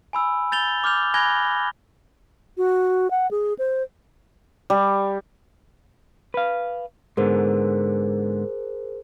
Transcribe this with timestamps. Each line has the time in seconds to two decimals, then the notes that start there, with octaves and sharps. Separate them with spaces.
0.13 G#5 B5 E6
0.52 G6 A6 F7 G7
0.84 D6 F6 G6 F7
1.14 G#5 B5 F#6 G#6 A#6 G7
2.57 F#4
3.11 F#5
3.31 G#4
3.59 C5
4.70 G3
6.34 B4 F5
7.17 G#2 D3 B3 G#4 A#4 C5